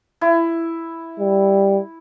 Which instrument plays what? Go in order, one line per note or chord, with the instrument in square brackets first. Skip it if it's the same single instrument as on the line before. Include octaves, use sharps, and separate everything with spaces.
[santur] E4
[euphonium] G3